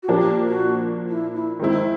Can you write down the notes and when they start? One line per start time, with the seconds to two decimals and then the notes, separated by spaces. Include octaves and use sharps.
0.03 F#4
0.08 A#2 F3 A#3 D4 G4
0.47 F#4
1.09 E4
1.35 E4
1.60 D#3 G#3 C4 D#4 E4